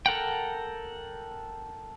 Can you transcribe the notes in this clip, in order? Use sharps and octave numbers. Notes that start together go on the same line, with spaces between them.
A4 A#4 F#5 G5